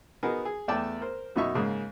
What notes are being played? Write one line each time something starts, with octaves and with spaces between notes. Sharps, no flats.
B3 D#4 F#4 G#4 A#4
G#4
E2 A3 D5 G5 A5
A#4 C5
F#2 B2 D#4 E5 C#6 D#6
G#2 C#3 A#3